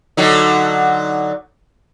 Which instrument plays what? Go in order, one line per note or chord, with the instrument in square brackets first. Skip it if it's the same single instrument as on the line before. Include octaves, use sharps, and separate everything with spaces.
[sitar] D3 F#3 D#4